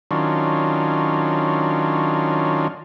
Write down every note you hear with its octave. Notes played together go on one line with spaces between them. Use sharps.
D#3 F#3 C#4 D4 F4